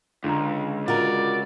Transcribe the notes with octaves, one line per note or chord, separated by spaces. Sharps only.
C#2 D3 A#5
F4 F#4 A#4 D5